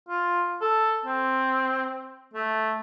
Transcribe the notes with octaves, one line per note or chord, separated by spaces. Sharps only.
F4
A4
C4
A3